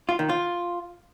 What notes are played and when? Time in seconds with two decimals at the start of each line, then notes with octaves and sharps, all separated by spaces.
0.09 F4
0.19 D#3
0.29 F4